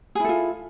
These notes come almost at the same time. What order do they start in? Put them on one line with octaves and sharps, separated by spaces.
G#4 E4 A4 F4